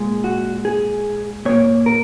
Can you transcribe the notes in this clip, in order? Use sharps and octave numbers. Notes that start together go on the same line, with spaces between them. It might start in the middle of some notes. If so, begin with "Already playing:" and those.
Already playing: A#2 G#3
F#4
G#4
A#2 A#3 C#5
A#4